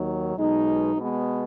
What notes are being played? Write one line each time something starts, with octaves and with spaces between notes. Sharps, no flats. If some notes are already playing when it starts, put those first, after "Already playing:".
Already playing: D#2 D#3 F#3
B1 B2 G#3 D#4
B2 G#3 B3